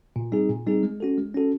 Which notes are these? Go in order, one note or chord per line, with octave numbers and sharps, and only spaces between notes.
A#2
G3 C4 D#4 G#4
A#2
G3 C4 D#4 G#4
G#3
C#4 F#4 A4
G#3
C#4 F#4 A4